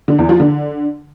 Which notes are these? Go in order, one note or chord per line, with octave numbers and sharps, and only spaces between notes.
D3
E2
F3
D3